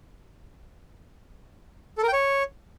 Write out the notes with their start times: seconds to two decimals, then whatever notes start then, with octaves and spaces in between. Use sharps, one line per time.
1.98 A4
2.03 A#4
2.08 G5
2.13 C#5